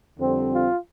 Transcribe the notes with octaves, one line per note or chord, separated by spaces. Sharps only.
F2 D3 G3 C4
F4